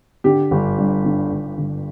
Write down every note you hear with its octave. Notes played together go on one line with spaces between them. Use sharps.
D3 G4
G1
G2
D3
G1
G1